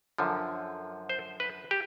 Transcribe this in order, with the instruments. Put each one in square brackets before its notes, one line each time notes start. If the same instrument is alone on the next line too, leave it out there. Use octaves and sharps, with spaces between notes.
[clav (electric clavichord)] F#2 D3 F3
C5
B4
G4